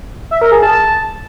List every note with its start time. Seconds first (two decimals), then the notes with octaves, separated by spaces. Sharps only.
0.31 E5
0.41 A#4
0.52 G#4
0.62 A5